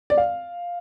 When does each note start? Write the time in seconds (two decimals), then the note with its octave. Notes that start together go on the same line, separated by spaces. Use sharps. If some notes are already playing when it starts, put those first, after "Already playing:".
0.10 D5
0.17 F5